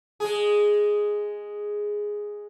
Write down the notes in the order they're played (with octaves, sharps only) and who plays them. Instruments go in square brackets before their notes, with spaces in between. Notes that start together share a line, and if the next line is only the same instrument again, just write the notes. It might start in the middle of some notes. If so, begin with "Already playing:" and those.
[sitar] G#3 G#4